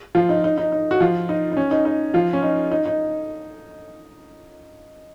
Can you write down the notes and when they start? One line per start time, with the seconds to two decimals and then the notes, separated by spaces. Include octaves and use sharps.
0.15 F3 F4
0.29 D#4
0.44 D#4
0.58 D#4
0.72 D#4
0.91 F#4
1.00 F3 F4
1.29 D#4
1.52 D#4
1.57 C#4
1.71 D#4
1.85 D#4
2.14 F3 F4
2.33 C#4
2.43 D#4
2.72 D#4
2.86 D#4